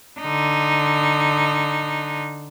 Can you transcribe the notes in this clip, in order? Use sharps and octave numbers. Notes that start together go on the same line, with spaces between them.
D3 D#4